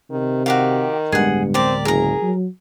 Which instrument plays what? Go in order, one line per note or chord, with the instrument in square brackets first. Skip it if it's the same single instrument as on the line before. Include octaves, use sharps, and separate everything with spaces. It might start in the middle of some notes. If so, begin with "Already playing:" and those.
[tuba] C3 [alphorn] D#3
[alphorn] D#3 [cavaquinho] F#4 G4 F5
[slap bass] D1 G#3 B3 [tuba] G2 [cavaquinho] G#4 F#5
[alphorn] C4 [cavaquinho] G4 A#4 D5
[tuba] F#1 [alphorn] G#4 [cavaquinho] A#4 A#5
[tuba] F#3